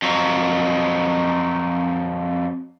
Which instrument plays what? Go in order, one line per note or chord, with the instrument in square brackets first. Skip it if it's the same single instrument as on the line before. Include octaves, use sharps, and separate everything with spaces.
[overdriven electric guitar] F2 F#3